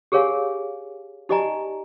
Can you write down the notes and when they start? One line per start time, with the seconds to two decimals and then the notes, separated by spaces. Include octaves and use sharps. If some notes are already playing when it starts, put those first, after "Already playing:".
0.12 G4 G#4 A#4 C#5 F5 G#5
1.29 D#4 G4 D5 D#5 G#5 A#5